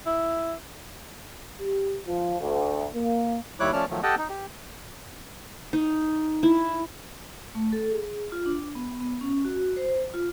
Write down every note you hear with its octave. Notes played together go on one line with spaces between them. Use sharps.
E4
G4
F3
D2
A#3
D#2 G3 E4 C#5 D6 F#6
F3 A3 C#4 D5 A5 F6
D#3 F3 F#3 A3
G4 A4 D#5 F#5 G5 A5
D#4
G4
D#4
E4
A3
A4
G#4
F4
D4
B3
B3
C#4
F#4
C5
F4